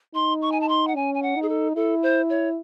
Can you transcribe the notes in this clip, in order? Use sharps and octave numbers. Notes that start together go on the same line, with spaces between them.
D#4 C6
C#6
G#5
A5
C6
F#5
C#4 G#5
G#5
F#5
D#4
G#4
A4
E4 A4
C5
C#5